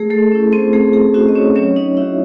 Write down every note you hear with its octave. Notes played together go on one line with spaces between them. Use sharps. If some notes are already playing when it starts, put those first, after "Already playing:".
Already playing: A3 G#4
A3 A4
C#4 E4
C4 C5
A3 G#4
G#4
C#4 E4 F#4
D#5
C#4 C#5
F#3 C#4 C#5
D#4 D#5
C#4 E4 F#4 E5